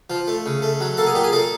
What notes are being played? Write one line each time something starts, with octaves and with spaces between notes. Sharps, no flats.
F3
A3
C#3
A3
F#3
A#3 A4
G#4
A#2 G4
G#4
A#3 A4